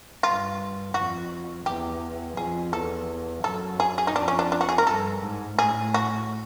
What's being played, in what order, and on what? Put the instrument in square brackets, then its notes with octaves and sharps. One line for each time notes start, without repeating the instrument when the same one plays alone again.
[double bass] G2 [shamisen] F4
[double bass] F2 [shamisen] F#4
[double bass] E2 [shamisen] G4
[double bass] F2 [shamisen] G#4
[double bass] E2 [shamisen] A4
[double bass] F#2 [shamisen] A4
[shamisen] G#4
G#4
D#4
[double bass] F2 [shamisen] D4
[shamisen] C#4
D4
D4
F#4
G#4
A#4
[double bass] G2 [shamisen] A4
[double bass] G#2
[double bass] A2 [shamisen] G#4
[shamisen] F#4